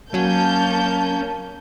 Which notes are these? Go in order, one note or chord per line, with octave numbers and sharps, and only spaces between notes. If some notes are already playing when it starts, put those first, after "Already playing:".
F#3 A#3 C#4 A5 G6